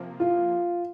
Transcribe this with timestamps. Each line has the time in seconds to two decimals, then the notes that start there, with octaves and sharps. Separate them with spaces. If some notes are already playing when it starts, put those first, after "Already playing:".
Already playing: C3 F3 A#3
0.20 F4